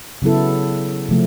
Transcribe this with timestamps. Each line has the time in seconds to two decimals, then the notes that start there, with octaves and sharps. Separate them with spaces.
0.22 C#3 F#3 B3 E4 A4
1.09 C3 F3 A3